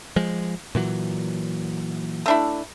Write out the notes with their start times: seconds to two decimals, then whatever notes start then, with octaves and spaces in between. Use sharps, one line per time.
0.16 F3 G#3
0.75 A#2 E3 F#3
2.26 A3 D4 E4